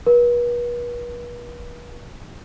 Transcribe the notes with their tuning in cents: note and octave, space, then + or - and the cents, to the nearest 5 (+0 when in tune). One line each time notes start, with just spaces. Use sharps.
B4 -40